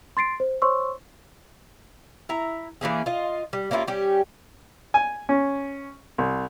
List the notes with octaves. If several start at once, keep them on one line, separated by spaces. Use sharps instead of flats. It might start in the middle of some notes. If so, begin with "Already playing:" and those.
C6 A6 C7 D7
C5
C5 C#5 C6 C#6 E6
E4 A#5
E3 A#3 C#4 G#4
F4 D#5
G3
A#3 C#4 E4 F4
G3 C#4 G4
G#5
C#4
C2